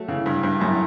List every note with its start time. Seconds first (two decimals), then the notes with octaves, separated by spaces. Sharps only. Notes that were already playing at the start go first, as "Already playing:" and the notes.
Already playing: F#3 A3
0.08 C#3 E3
0.26 G2
0.43 G2
0.60 F#2 A2